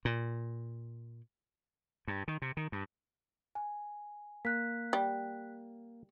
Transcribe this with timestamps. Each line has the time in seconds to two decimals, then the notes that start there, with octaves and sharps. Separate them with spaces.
0.05 A#2
2.07 G2
2.28 D#3
2.42 C3
2.57 D#3
2.72 G2
3.55 G#5
4.45 A#3 F#6 B6
4.93 G3